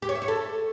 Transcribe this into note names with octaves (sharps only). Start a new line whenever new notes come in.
G4
C#5
E5
C#5
A4